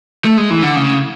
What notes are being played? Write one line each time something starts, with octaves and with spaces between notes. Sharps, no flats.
A3
G#3
E3
D3
C#3